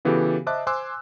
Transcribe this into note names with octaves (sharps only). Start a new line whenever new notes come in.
C#3 E3 B3 F#4 G4 A4
C5 D#5 E5 A5 D6 F#6
C5 G#5 C6 D6 E6 F#6